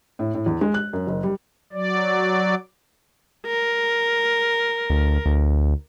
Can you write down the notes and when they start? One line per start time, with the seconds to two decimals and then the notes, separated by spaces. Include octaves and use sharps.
0.19 A2
0.34 A2
0.46 E2
0.61 G#3
0.74 F#6
0.93 F#2
1.07 F#1
1.23 G3
1.73 F#3 D5
3.47 A#4
4.90 D2
5.26 D2